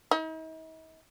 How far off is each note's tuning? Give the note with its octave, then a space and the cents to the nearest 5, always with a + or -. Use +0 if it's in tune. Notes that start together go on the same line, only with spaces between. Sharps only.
D#4 +45